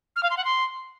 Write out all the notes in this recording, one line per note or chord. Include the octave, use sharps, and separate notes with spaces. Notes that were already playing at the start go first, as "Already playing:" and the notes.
F6
F5
C6
F#5
C6